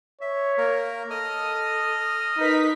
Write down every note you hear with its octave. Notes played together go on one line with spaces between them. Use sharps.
C#5 E5
A#3 A#4
A4 D#5 D#6 F6
D#4 A#4 B4 B6